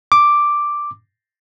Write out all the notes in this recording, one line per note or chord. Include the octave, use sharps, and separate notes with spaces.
D6